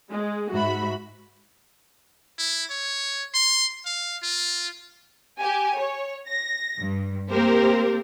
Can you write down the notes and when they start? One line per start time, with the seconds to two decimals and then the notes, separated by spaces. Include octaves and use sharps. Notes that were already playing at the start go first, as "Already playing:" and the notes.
0.12 G#3
0.52 G#2 F#4 E5 B5
2.39 E4
2.70 C#5
3.34 C6
3.86 F5
4.23 F4
5.39 G4 G#5
5.78 C#5
6.30 A#6
6.78 G2
7.31 A#3 C4 G4 A#4 C5